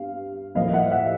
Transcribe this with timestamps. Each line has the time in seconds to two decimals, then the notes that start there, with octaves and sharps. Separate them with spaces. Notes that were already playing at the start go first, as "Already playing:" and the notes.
Already playing: G2 B3 F5
0.55 A2 F3 A#3 D#5 F5
0.73 E5 F#5
0.92 E5 F#5